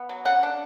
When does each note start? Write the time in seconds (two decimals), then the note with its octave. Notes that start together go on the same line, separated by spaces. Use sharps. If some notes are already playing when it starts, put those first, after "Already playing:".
Already playing: B3
0.09 F#3
0.25 C#3 F#5
0.43 D4